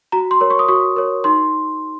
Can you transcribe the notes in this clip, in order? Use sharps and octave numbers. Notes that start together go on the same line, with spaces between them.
F#4 A#5
C6
A#4 C#5
C#6
D#6
F#4 C#6
A#4 C#5
D#4 C6